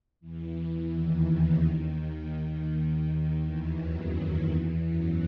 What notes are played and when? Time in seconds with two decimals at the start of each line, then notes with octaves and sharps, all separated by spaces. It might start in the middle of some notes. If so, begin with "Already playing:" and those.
0.20 E2 E3
0.57 E2 E3
0.93 D#2 D#3
1.29 C#3
1.64 D#2 D#3
3.08 D#2 D#3
3.44 E2 E3
3.80 F#2 F#3
4.52 E2 E3
4.87 F#2 F#3